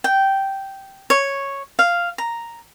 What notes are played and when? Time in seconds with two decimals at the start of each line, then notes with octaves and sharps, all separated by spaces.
0.04 G5
1.10 C#5
1.79 F5
2.18 A#5